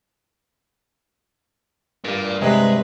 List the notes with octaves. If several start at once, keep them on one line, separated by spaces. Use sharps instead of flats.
G2 A#4 D5
C3 G#3 G#4 B4 D#5